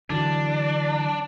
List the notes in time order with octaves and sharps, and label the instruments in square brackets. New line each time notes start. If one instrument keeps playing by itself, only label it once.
[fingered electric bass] D3 E3 F#3 [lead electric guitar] D4